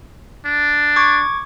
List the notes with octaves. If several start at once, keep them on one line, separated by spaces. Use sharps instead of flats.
D4
C#6 D6 G#6